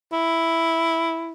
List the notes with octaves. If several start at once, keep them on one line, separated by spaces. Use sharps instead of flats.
E4